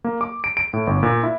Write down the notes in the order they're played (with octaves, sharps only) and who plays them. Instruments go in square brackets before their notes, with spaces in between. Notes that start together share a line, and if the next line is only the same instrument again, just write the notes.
[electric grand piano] A#3
D6
D7
D7
A2
G1
A#2
E4